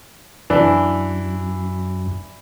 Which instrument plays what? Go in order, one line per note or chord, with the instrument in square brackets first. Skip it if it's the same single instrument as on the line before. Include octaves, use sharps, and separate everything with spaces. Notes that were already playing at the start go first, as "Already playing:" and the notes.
[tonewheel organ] F#2 [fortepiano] E3 D4